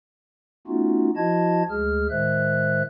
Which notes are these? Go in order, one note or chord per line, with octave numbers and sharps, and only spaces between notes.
A3 B3 C#4 D#4 F4 F#4
F3 E4 F#4 D#5 A5 G#6
D2 G#3 G#4 F6
A2 D#3 G#3 C5 E5 F#6